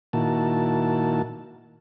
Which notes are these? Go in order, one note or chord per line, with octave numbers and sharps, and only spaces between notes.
A#2 D#3 A#3 E4 F#4 A5